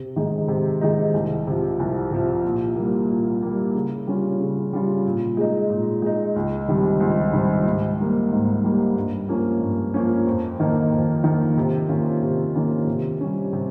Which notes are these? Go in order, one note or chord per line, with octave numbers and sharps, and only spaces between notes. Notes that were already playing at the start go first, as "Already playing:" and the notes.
Already playing: C3
D#3 G#3 D#4
C3
D#3 G#3 D#4
C2
C3 F3
C2
C3 F3
A#2
G3 A#3
A#2
G3 A#3
C#3
G3 C#4 F4
C#3
G3 C#4 F4
A#2
G#3 D#4
A#2
G#3 D#4
C#2
C3 D#3 G3 C4
C#2
C3 D#3 G3 C4
G#2
G3 A#3
G#2
G3 A#3
G2
F3 A#3 C#4
G2
F3 A#3 C#4
F2
D#3 A#3 D#4
F2
D#3 A#3 D#4
C3
D#3 A#3 C#4 F4
C3
D#3 A#3 C#4 F4
C3
G3 C#4
C3